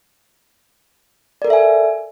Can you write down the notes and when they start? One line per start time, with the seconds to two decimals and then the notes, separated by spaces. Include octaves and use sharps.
1.42 D5
1.45 A#4
1.47 A4
1.50 E5
1.53 G#5